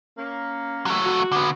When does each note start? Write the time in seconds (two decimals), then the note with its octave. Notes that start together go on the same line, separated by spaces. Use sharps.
0.17 A#3 C#4
0.86 F#3 A3
1.05 F#4
1.32 D3 B3